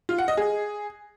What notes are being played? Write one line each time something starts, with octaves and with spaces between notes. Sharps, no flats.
F4
F#5
D#5
G#4